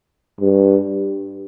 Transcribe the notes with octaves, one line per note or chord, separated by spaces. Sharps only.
G2